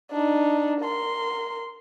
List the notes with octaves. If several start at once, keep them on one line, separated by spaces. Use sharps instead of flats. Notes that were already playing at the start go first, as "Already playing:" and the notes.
D4 D#4
A#4 C6